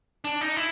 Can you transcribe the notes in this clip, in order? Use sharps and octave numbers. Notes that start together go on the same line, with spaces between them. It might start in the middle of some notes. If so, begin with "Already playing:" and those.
D4
D#4
E4